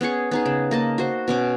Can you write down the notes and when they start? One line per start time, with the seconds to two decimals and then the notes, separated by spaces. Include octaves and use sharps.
0.01 B3 C#4 G#4 C#6
0.31 B3 D#4 G#4
0.46 C#3
0.71 A#3 D#5 A5
0.98 F#4 C5
1.28 B2 C#4 D6